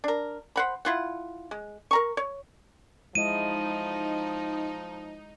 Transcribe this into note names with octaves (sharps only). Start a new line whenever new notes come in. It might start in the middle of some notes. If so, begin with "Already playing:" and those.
D4 A#4
C5 F#5 B5
E4 F4 F#5
G#3
A#4 A#5 C#6
C#5
F3 G#3 D#4 E4 D#5 D#7